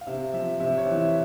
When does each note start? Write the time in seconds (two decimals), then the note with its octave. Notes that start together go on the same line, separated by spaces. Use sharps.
0.01 F5
0.07 C3 E5
0.33 F3 E5
0.60 C3 E5
0.78 C#5
0.87 E3
0.96 E5